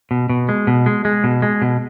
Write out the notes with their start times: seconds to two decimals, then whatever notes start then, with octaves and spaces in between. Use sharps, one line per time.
0.11 B2
0.29 B2
0.49 G#3
0.67 B2
0.86 G#3
1.05 G#3
1.24 B2
1.42 G#3
1.62 B2